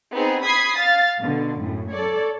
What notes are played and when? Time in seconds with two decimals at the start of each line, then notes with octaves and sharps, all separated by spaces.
0.13 B3 C4 D#4 G#4
0.43 B5 D#6 G#6 B6 C7
0.77 F5 A6
1.20 B2 D3
1.61 F#2 A2
1.91 A4 C#5 D5